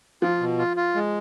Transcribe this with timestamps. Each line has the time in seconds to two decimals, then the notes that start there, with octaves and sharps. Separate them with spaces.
0.22 F3 F4
0.40 B2
0.59 F4
0.77 F4
0.95 G#3